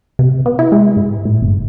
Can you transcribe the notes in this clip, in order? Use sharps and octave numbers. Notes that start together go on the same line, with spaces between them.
C3
B3
E4
G#3
G#2
A2
G1